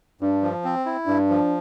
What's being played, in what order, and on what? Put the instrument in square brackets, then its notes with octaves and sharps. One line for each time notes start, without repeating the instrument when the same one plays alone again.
[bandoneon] G2 [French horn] D4
[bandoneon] F3
C4
E4
[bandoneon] G2 [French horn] D4
[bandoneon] F3